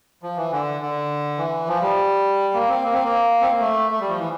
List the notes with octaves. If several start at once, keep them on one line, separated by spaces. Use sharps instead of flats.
F3
E3
D3
D3
E3
F3
G3
A#3
C4
A#3
C4
A#3
C4
A#3
A3
A3
G3
F3
E3